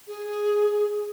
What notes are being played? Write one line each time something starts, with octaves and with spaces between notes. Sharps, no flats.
G#4